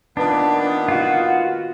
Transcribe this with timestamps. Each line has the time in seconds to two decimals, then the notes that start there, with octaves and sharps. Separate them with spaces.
0.17 A#2 D#3 B3 D4
0.88 F4 F#4